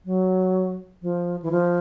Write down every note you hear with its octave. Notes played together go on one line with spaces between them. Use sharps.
F#3
F3
E3
F3